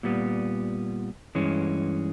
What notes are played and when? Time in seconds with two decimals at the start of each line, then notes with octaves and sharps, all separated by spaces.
0.03 A#2 G3 B3
1.35 G2 E3 G#3 C#4